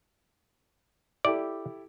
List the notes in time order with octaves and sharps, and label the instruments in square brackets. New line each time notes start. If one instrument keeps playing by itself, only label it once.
[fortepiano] E4 G4 A4 [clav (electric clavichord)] D5